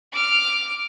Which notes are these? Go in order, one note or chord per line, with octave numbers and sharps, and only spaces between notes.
D6 F6